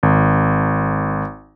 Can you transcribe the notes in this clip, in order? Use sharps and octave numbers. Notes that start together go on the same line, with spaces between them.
G#1